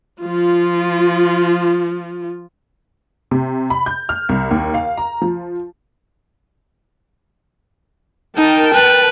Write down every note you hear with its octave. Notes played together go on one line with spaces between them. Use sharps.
F3 F4
C3
B5
G6
F6
C2
D#2
F5
A#5
F3
D#4 A#4 G5 A5
B4